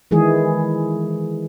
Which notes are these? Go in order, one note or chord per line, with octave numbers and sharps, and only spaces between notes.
D#3 E3 G#3 G#4